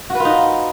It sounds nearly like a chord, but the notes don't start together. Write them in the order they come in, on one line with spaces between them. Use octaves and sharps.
F#4 B4 F4 D#4